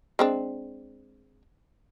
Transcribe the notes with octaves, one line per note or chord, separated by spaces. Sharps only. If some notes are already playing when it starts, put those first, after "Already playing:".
G#3 C4 D4